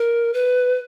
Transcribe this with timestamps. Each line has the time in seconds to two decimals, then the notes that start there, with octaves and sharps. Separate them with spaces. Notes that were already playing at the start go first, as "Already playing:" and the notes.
Already playing: A#4
0.34 B4